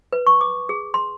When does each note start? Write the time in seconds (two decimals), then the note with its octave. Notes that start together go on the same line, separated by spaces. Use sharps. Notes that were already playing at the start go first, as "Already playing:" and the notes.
0.13 B4
0.27 C#6
0.41 D6
0.69 G#4
0.94 C6